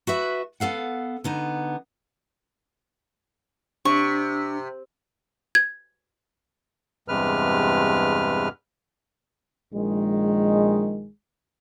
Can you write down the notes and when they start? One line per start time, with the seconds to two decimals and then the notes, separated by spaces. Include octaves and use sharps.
0.07 F#4 B4 E5
0.60 B3 A4 F5 F#5
1.24 D3 B3 D#4
3.85 C3 D4 C#6
5.55 G#6
7.08 E2 G2 C3 G#3 B4 F6
9.73 A#1 D#3 G#3